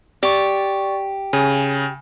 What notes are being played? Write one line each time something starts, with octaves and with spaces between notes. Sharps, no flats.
G4 D5 C#6
C#3 G#5